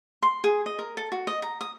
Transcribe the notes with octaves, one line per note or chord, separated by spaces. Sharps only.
C6
G#4
D#5
A#4
A4
F#4
D#5
A#5
D#6